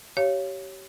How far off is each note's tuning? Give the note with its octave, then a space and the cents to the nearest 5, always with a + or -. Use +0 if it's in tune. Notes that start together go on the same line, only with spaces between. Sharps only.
G4 -25 C#5 +0 F5 -15